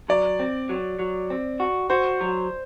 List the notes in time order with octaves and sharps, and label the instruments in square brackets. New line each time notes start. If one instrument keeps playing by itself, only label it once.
[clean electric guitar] F#3 [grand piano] D5
[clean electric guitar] C4
F#3
F#3
C4
F#4
[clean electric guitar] F#4 [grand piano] C5
[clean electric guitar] F#3